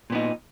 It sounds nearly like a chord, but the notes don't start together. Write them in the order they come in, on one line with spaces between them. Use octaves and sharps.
A#2 B3 D#4